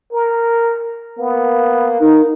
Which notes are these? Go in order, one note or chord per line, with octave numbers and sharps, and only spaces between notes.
A#4
A#3 B3
D#4 A#4